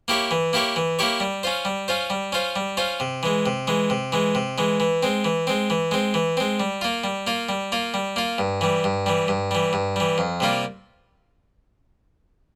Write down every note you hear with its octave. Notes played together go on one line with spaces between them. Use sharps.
A#3 E4 G4 C#5
E3
A#3 E4 G4 C#5
E3
A#3 E4 G4 C#5
G3
C#4 F4 C5
G3
C#4 F4 C5
G3
C#4 F4 C5
G3
C#4 F4 C5
C3
E3 G#3
C3
E3 G#3
C3
E3 G#3
C3
E3 G#3
E3
G#3 C4
E3
G#3 C4
E3
G#3 C4
E3
G#3 C4
G3
A#3 F4
G3
A#3 F4
G3
A#3 F4
G3
A#3 F4
G2
E3 G3
G2
E3 G3
G2
E3 G3
G2
E3 G3
F2
C3 G3 A#3 F4